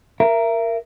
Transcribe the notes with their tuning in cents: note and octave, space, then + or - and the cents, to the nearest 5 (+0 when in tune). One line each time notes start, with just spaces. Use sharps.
A#4 +0 E5 +30